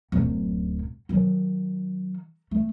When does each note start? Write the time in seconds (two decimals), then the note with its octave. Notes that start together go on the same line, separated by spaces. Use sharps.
0.12 D1 F#2
1.09 D#3 F#3
2.51 A3